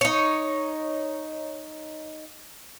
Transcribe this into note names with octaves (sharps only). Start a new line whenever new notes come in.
D#4 C#5